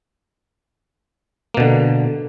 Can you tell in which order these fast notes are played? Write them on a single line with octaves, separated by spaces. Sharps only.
A#3 B2 D3